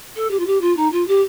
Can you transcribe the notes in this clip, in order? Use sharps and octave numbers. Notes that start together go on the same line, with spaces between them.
A4
G4
F4
G4
F4
D#4
F4
G4